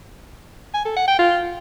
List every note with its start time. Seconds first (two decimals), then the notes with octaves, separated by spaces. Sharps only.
0.74 G#5
0.85 A4
0.97 F#5
1.08 G5
1.19 F4